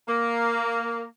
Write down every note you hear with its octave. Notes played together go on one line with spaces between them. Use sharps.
A#3